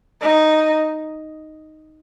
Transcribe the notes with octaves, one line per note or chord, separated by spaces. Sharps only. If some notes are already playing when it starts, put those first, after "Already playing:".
D#4